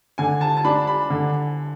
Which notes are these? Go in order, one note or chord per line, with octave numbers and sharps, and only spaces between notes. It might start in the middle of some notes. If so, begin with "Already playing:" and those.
D3 G#5
A5
A5
D4 B5
B5
D3